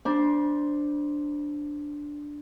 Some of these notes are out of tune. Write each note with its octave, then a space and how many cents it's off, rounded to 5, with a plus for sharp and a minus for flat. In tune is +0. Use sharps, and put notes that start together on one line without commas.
D4 +0 C5 +0 B5 -45